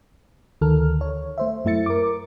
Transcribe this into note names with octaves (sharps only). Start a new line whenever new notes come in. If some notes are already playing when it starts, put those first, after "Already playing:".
D2 D#3 A4 A#4 F6
C#5
A3 C5 E5
F#2 A3 E4 E5 A6 C#7
A#4 D6